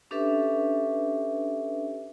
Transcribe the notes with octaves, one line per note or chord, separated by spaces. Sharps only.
C#4 D4 G4 A4 B4 E5